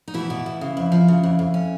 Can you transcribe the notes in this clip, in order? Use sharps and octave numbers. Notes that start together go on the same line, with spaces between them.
D#4
B2 E3 E4
B2
B2
C#3
F2
F3
C#3
F2
F2
C#4